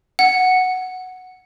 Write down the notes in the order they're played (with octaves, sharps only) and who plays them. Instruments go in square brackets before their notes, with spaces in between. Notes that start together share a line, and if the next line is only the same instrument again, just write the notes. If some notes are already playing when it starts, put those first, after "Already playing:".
[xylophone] F#5